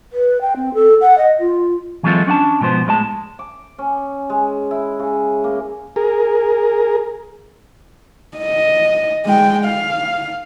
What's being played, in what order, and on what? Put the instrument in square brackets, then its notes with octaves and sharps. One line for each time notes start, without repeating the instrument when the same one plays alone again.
[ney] B4
G5
C4
A4
F#5
D#5
F4
[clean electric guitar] E3 F#3 G#3 C4 F4 A4
C#4 D4 F#5 A5
G#2 B2 F3 B3 C5
A2 G#3 D5 A5
[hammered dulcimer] D6
C#4
G#3
E4
C#3
A#3
[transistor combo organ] G#4 A#4
[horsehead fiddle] D#5
G#3 G5
F5